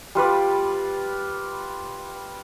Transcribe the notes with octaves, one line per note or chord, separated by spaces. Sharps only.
G3 F4 B4 D5